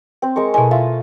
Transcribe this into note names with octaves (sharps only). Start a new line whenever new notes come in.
C4 C5
G#3 A#4 C#6
B2 A3 E4 D#5 G#5
F4 E5